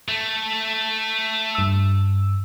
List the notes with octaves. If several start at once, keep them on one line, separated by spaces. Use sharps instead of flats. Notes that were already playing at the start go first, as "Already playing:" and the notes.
A3
G2 E6